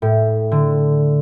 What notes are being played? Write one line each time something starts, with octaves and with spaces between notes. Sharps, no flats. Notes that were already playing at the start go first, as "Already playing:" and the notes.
A2
D3